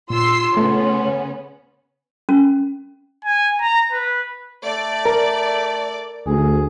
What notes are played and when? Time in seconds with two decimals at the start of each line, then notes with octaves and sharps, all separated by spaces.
0.10 A#2 F4 C6 E6 C7
0.54 C#3 A3 B3 C#4 C6
2.29 C#4
3.25 G#5
3.61 A#5
3.92 B4
4.64 A3 D5
5.06 A#4
6.27 D2 G#4